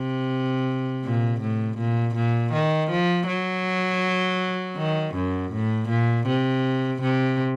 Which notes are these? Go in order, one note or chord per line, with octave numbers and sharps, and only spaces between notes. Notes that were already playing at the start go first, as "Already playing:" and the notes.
Already playing: C3
A#2
A2
A#2
A#2
D#3
F3
F#3
D#3
F#2
A2
A#2
C3
C3